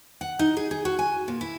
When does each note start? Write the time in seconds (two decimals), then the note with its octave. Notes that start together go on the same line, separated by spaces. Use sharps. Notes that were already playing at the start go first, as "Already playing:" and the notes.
0.21 F#5
0.39 D#4
0.57 G#4
0.71 G#4
0.85 F#4
0.99 G#5
1.28 A#2
1.41 E4